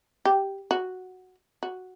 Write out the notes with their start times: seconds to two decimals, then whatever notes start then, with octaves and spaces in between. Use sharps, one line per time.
0.25 G4
0.71 F#4
1.63 F#4